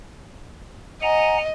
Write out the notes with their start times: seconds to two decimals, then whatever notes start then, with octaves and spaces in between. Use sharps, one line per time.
1.02 D#5 F#5 G#5 A#5